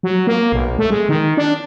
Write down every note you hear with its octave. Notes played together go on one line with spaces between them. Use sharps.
F#3
A#3
B1
A3
G#3
D#3
D4